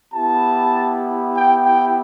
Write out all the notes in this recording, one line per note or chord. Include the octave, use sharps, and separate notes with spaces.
B3 E4 G4 A5
G5
G5